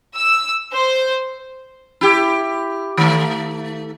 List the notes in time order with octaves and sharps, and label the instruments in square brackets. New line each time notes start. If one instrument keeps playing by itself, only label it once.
[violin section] E6
C5
[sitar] E4 G4
D#3 A3